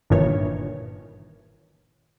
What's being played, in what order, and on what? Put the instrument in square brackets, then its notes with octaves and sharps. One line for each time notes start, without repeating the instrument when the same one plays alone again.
[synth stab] G1 G2 A#2 D#3 E3 C#5